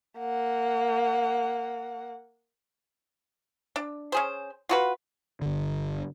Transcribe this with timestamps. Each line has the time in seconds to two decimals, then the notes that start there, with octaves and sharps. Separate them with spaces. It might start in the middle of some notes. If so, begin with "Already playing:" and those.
0.19 A#3 F#5
3.76 D4
4.12 C#4 G#4 C5
4.69 F4 F#4 B4
5.42 G1 D3